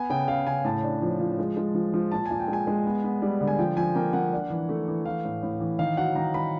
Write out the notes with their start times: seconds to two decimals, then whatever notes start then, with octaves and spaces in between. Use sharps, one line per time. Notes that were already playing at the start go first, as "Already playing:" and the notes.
Already playing: B3 G#5
0.10 C#3 G5
0.28 C#3 F5
0.46 C#3 G#5
0.64 A2 A5
0.83 D4
1.02 F3
1.20 F3
1.39 G#3
1.57 G#3
1.74 F3
1.94 F3
2.12 A#2 A5
2.26 G#5
2.31 A#2
2.40 G5
2.48 G#3
2.53 G#5
2.67 G#3
2.86 B3
3.04 B3
3.22 G3
3.41 D3
3.47 G#5
3.59 F3 G5
3.77 F3 G#5
3.95 A#3 G5
4.13 A#3 F#5
4.33 D4
4.50 E3
4.69 A3
4.88 E3
5.05 E3 F5
5.25 A2
5.43 A2
5.60 E3
5.79 D#3 F5
5.97 F#3 F#5
6.15 D#3 A#5
6.34 D#3 B5